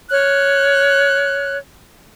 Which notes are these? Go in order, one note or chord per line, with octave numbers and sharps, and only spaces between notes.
C#5 F6 F#6